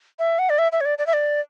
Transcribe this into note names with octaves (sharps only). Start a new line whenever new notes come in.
E5
F#5
D5
E5
E5
C#5
D5
D5
E5
D5